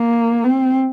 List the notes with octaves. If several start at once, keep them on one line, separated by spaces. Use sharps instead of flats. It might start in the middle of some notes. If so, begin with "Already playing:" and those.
Already playing: A#3
C4